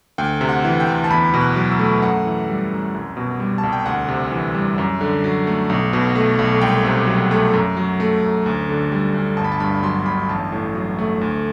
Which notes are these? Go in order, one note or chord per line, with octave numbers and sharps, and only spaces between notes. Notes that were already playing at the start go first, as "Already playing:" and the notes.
D2 G5
C3
F#5
E3
G5
D2
A5
E2 B5
B2
F#6
F#3
E6
A3
F#2 F#5
E3
G3
F#2
C2
B2
G3
A5
C2
G5
D2 F#5
C3
E3
G3
F#2
D3
F#3
A3
B1
B2
A3
B1
C2 G5
C3
F#3
A3
F#2
F#3
A3
F#2
D2
D3
G3
D2
G1 A5
B5
A5
G2 B5
F#3 C6
G1 B5
A1 A5
A2
F#3
A3
D2